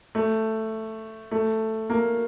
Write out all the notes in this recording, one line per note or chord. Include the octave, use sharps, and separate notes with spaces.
A3
A3
A#3